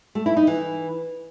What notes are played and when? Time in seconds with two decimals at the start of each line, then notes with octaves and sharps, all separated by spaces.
0.15 A3
0.26 E4
0.37 D#4
0.47 E3